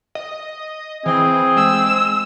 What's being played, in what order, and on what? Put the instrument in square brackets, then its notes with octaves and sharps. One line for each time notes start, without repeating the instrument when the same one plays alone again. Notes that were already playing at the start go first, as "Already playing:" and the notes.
[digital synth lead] D#5
[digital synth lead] E3 [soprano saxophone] C4 [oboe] G#4
[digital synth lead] G#3 [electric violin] E6